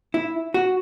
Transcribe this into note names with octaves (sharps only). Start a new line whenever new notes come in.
E4
F#4